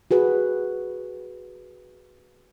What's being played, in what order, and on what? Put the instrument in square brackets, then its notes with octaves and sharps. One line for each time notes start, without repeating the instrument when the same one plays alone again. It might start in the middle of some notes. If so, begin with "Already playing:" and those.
[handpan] F#4 G#4 B4